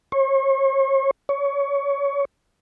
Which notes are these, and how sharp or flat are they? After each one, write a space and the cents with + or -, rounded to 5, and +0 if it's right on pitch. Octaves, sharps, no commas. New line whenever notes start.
C#5 -40
C#5 +20